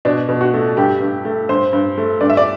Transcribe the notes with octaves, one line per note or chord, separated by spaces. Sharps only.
B2 D4
B2
F#4
A3
G2 G4
G2
A3
G2 C5
G2
A3
G2 D5
E5
D5